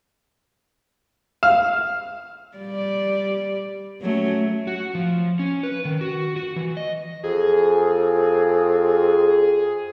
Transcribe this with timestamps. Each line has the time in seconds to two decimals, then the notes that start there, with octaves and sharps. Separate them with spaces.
1.43 F5
2.57 G3 D5
4.01 F#3 A3 C#4
4.67 F#4
4.95 F3
5.39 C#4
5.63 B4
5.85 D#3
6.01 F#4
6.36 F#4
6.56 E3
6.77 D#5
7.23 F2 G#4